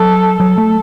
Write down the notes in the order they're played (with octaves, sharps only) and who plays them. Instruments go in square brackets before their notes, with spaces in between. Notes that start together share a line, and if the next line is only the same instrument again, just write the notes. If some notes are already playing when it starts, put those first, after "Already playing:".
Already playing: [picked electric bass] F#3 [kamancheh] A4
[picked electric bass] F#3 [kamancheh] A4
[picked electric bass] A3